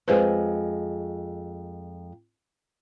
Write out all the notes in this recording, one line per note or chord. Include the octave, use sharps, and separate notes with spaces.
F2 G#3 B4 C5